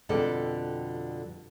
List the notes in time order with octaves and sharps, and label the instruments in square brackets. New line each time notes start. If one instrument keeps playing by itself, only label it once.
[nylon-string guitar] F2 B2 D3 G3 A4 D5